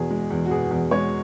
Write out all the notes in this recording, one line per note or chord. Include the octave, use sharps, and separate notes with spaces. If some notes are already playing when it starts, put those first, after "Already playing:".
Already playing: E2 B2 G#4
G#3
E2
F#4
B2 G#4
E2
G#3 C#5